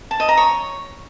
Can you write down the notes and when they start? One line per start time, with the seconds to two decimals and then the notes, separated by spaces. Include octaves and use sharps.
0.11 A5
0.20 D#5
0.29 A#5
0.37 C#5